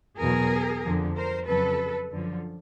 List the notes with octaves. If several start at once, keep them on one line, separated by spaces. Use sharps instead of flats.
E2 B2 F#3 G#4 A#4
F2 D3 F3
A#4 C5
F2 C#3 F#3 A4 B4
F#2 D3 F3